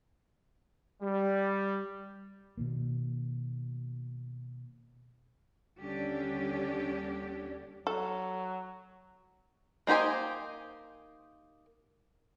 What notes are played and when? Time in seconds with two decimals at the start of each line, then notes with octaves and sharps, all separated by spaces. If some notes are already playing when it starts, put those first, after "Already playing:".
1.02 G3
2.57 B2 D#3 A#3
5.79 D#2 D3 G3 C#4 D4 G4
7.87 F#3 A4
9.87 A#3 D#4 G4 C5 G#5